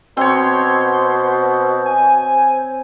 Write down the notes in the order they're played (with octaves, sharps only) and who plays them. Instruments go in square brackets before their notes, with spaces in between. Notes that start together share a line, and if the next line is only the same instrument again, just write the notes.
[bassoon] B2 [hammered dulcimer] C4 C#5 [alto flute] C5 [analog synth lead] C6
[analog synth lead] G#5